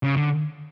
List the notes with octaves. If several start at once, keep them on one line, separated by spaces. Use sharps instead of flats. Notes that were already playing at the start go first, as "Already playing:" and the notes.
C#3
D3